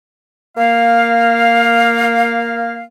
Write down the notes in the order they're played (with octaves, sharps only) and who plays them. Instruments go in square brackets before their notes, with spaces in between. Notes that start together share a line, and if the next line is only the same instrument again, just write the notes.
[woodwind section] A#3 F5